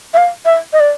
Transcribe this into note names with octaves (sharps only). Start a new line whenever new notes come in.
E5
F5
E5
D#5
D5